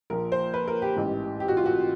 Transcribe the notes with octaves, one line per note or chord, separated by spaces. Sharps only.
A#1 A#2 F3 A#4
C5
B4
A#4
G4
A1 G#2 E3
G4
F#4
F4
F#4